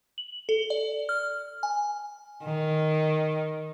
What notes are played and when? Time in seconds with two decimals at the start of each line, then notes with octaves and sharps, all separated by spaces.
0.18 F#7
0.49 A4
0.70 D5
1.09 F6
1.63 G#5
2.44 D#3